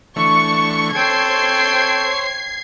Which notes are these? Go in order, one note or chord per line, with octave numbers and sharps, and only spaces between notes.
D3 E3 A3 C#6
C4 A4 C5 C#5 G5 G#6 C7